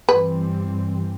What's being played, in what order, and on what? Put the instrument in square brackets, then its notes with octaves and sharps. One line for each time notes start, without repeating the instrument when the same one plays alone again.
[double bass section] G2 E3 G3 C4 [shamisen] B4